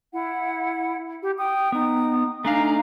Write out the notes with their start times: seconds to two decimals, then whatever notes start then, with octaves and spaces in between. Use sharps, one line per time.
0.13 E4 F#5
1.22 G4
1.38 G5 D#6
1.72 B3 D#4 D#6
2.45 A3 D4 D#4 F5 G#5 A#5